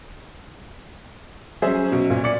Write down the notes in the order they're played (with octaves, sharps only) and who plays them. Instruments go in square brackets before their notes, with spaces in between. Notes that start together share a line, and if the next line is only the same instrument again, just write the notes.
[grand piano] F#3 C#4 [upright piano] G#4 C5 E5
[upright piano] B2
[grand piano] A#2
[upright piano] D5 C#7